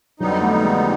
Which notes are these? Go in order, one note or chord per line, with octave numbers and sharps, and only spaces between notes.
F2 D3 F#3 G3 B3 D#4
A3
G#3